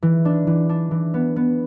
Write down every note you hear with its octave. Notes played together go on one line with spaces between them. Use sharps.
E3
D4
E3
D4
E3
B3
B3